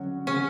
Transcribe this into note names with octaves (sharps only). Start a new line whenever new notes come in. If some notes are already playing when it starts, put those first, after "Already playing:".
Already playing: D3 F#3 C#4 F#4
C#3 C#4